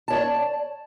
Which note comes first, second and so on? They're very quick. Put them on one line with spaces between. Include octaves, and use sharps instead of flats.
A5 C#5 D5